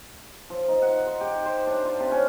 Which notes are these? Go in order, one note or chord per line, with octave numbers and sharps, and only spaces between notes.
F3
D#4
F#5
C6
G4
C5
D4
F4
C3
C#4